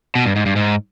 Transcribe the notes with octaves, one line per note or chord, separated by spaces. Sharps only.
B2
G2
G#2
G2
G#2